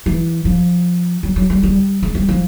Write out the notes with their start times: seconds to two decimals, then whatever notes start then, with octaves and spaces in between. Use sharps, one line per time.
0.06 E3
0.45 F3
1.23 F#3
1.36 F#3
1.50 G3
1.63 G3
2.03 G#3
2.15 G3
2.29 F3